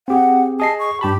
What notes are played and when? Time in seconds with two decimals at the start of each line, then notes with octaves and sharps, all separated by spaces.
0.08 C4 G4 G#4 F#5
0.60 G#4 D#5 A5 C7
0.79 C#6
1.01 G2 G4 A5 B5